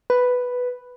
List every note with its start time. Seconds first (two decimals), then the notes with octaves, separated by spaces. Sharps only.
0.10 B4